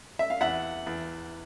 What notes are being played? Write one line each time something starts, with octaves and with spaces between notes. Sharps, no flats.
E5
F5
E2 E5 F#5
E2